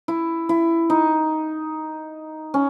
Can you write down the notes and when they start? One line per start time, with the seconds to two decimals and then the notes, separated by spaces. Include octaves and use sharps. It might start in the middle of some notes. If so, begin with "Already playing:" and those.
0.08 E4
0.49 E4
0.90 D#4
2.54 C#4